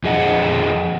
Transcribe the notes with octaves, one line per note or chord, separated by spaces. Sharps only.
F2 G#4 D#5 F#5